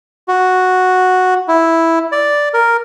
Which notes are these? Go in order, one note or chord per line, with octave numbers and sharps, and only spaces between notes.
F#4
E4
D5
A#4